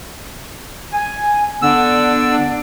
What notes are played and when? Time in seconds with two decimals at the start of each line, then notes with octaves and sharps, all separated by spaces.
0.93 G#5
1.62 D3 B3 D4 E6